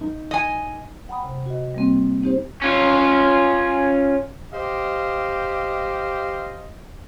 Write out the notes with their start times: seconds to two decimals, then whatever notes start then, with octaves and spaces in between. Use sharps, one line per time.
0.01 D#4
0.31 D#5 G#5
1.09 F#5 G5 A#5 B5 D#6
1.23 C3
1.46 F#4 D#5
1.75 G3 A#3 C4
2.22 C4 D#4 G4 C5
2.62 C#4 F4
4.54 G4 C5 D#5 F5